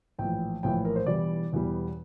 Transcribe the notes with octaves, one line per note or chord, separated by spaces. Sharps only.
A#1 A2 E3 G5
A#1 A2 E3 G5
A#4
C5
E1 E2 E3 G3 D5
E1 E2 E3 G3